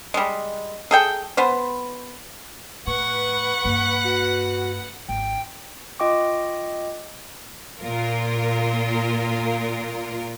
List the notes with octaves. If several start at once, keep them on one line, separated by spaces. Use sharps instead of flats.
G3 G#3
G#4 A4 G5
B3 B4 C5
A2 B4 F#5 C#6
G2 A#3
F#4
G#1 G5
F4 D#5 G5 C#6 D6
A#2 F4 A#4